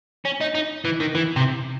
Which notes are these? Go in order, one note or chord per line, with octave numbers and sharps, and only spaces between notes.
C#4
D#4
D#4
E3
D#3
E3
C3